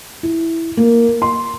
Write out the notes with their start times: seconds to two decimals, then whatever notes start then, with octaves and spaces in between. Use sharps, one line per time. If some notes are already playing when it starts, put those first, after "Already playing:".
0.23 E4
0.77 A#3
1.22 C6